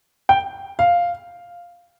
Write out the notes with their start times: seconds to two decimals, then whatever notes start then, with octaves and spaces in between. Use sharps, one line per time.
0.29 G5
0.79 F5